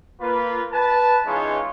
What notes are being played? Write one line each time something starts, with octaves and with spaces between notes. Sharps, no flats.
A#3 F4 B4
B4 A5
E3 G#3 C#4 D#4 F4 C#5